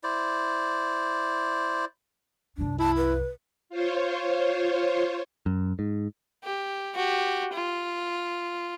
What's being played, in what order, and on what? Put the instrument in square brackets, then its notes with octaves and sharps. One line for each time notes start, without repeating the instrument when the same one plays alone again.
[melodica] E4 C5 D5
[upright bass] C2 F#2 [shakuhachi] D4
[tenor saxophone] E4 [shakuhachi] A5
[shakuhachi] B4
[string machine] F4 C5 C#5
[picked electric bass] F#2
G#2
[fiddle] G4
F#4 G4
F4